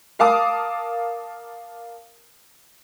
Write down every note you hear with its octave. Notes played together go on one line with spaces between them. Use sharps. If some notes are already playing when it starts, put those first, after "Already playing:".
A#4 F5 A5 D6 D#6